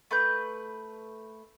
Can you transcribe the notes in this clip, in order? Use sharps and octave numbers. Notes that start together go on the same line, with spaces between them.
A3 B4 G6